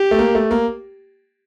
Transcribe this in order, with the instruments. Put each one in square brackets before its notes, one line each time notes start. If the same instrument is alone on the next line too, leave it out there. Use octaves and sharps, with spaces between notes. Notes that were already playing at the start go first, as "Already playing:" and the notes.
Already playing: [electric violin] G4
[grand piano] A3
A#3
A3
A#3